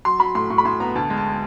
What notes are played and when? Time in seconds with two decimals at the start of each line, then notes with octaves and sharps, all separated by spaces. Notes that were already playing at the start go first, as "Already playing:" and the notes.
0.05 F#3 C6
0.20 F#3 B5
0.35 A2 C6
0.50 A2 C#6
0.58 B5
0.65 A2 C6
0.80 B3 A#5
0.96 D2 A5
1.10 G#3
1.17 A5